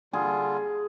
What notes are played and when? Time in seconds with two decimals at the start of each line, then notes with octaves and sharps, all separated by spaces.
0.13 D3 G3 F4 G#4